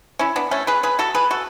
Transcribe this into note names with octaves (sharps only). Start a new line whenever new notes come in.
C#4 E4
B3 D4
A3 C#4
G#4 B4
G#4 B4
F#4 A4
G#4 B4
F#4 A4